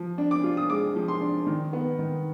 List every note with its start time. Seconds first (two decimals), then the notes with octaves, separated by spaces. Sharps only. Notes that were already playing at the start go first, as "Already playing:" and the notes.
Already playing: F3
0.18 D4
0.31 D6
0.44 F4
0.57 D#6
0.70 G#3 D6
0.96 F3
1.08 C6
1.21 D4
1.47 D#3
1.73 B3
1.99 D#3